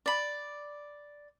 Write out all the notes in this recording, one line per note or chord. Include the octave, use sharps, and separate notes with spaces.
D5 B5